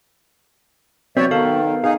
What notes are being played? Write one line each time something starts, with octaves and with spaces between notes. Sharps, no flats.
F#3 B3 C4 F#4 C#5 D5 E5
D#3 A4 F5
D#4 G#4 F5